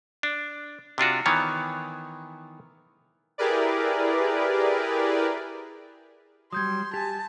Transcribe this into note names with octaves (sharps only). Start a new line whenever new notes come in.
D4
C3 D4 F4 F#4
D#3 E3 B3 C#5
E4 G4 G#4 A#4 B4 D5
F#3 G3 C6 D#6 G6 G#6
G4 G#5 A5